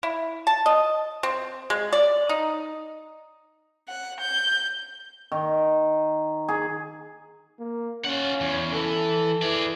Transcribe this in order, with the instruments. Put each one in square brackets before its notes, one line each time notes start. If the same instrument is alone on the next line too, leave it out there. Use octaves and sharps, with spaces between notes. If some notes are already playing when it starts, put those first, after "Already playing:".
[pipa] E4
A5
D#5
C4
G#3
D5
D#4
[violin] F#5
G6
[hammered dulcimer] D#3
G#4
[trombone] A#3
[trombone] C#4 [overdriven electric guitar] F4 F#5
[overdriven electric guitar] E2
[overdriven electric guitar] E3 [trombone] A4
[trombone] E3 [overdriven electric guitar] G#4 D5